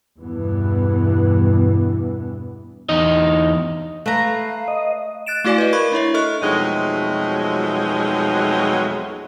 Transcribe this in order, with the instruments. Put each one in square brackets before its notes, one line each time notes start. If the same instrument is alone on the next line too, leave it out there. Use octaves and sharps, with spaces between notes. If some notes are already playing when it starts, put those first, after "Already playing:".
[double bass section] E2 G2 B2 E3 B3
[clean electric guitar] E2 D#4 D#5
[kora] A3 [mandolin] B4 A#5 [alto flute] F5
[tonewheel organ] D#5
[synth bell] F#6 A6 D7 E7
A3 E4 F#4 D5 F5 G#5
B4 D#5
A#4 B5 C#6 G#6
D4 E4 C#5 E5
A4 D#5 C#6 F#6
[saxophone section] F2 B2 F#3 G#3 A3 D#4